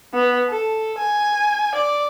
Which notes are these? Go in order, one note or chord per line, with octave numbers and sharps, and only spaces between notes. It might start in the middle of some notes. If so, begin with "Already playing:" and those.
B3
A4
G#5
D5